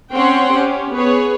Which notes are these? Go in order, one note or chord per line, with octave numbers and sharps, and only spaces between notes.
C4 C#4 C#5 F#5 G5 C6
C#4 G4
B3 G#4 B4 C#5